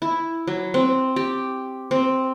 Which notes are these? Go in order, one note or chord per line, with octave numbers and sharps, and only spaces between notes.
E4
F#3
C4
G4
C4